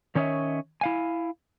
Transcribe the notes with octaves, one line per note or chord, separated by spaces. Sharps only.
D#3 C#4 C#5 D#5 E5
E4 F5 G#5